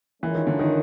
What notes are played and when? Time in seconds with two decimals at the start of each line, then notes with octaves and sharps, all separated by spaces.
0.23 E3 G#3 C#4 F4 A#4 C#5
0.35 D#3
0.47 D3
0.59 D#3